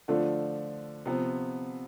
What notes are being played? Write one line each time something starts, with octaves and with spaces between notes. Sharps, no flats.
D3 F3 A3 D4 F4
C3 F3 B3